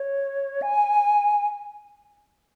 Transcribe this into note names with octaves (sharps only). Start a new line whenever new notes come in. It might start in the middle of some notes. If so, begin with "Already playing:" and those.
Already playing: C#5
G#5